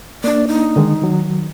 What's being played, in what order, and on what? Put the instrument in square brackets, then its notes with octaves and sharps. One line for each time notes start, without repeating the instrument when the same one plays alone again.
[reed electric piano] A#3 D4 [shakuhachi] D5
[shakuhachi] D#4
[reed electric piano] D3 D#3 G#3
D#3 F#3